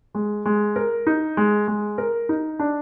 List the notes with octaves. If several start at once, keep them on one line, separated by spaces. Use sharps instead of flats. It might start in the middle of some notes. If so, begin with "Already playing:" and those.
G#3
G#3
A#4
D#4
G#3
G#3
A#4
D#4
D4